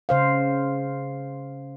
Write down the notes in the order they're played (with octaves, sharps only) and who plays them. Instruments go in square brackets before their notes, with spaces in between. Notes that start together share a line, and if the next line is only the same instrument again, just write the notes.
[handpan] C#3 C5 F5